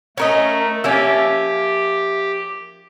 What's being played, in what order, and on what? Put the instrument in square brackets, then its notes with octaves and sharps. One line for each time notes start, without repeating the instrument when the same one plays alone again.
[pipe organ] A3 [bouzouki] C#4 A#4 D#5
[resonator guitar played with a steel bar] F3 A#3 C#4 [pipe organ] G4 [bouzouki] E5